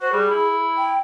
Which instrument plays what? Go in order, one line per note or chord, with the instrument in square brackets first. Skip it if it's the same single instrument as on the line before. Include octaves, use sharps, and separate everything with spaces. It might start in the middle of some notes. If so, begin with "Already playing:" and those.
[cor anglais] F#4 [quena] C5
[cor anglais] G3 [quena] G#4
[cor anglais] E4
[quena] G5